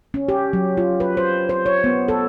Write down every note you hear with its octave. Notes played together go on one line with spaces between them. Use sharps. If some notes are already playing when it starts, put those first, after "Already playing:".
C#4
G4
F#3
F4
B4
C5
C5
C#5
B3
A4